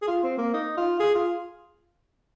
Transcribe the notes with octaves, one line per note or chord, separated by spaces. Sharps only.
G#4
F4
C4
A#3
D#4
F4
G#4
F4